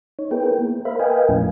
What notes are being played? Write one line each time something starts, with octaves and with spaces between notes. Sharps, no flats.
D#4 C#5
B3 E4 G#4 A#4 B4 G5
A#3
A#4 C5 E5 F5 B5
A#4 B4 D#5 F5 G5 G#5
F2 A#2 F3 A3 C#4 E4